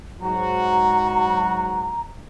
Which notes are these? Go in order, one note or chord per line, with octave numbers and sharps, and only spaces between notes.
G#2 F#3 F#4 A#5